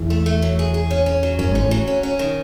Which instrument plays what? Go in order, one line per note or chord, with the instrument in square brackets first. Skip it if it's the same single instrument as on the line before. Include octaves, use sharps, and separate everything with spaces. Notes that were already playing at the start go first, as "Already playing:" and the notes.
Already playing: [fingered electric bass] E2 E3
[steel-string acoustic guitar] A3
A3
F#3
G#4
G#4
C#4
C#4
F#3
[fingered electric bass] F#2 [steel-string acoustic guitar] C#4
[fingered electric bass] G#1 G#2 [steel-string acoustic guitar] C#4
[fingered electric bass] A1 A2
[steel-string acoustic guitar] F#3
C#4
C#4
D#3